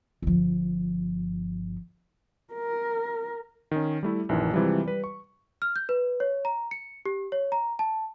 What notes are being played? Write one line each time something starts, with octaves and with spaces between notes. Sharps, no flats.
G1 F3
A#4
D#3 C#4
G3 A3 E4
A#1 F#2 D#3 E3
C3 E3 F3 G3 G#3
G3 B4
C#6
F6
G6
B4
C#5
A#5
C#7
G4
C#5
A#5
A5